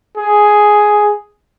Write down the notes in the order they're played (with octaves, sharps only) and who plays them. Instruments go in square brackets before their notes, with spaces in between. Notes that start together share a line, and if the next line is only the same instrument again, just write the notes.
[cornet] G#4